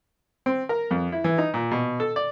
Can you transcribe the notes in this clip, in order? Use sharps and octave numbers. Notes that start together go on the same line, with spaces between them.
C4
A#4
F2
E4
E3
D#4
A#2
B2
A4
D5